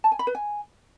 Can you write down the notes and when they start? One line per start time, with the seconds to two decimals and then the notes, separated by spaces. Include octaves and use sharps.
0.04 A5
0.12 G#5
0.19 B5
0.27 B4
0.35 G#5